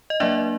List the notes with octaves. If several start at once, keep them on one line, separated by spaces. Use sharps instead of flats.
D#5
F#3 A#3 D4 D5 E5